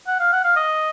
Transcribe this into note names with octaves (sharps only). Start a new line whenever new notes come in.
F#5
F5
F#5
F5
D#5